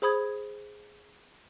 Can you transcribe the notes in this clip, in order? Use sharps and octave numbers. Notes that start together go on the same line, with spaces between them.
G#4 C5 B5 D#6 G#6